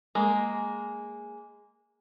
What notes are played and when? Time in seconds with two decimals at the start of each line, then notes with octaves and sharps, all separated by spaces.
0.15 G#3 A#3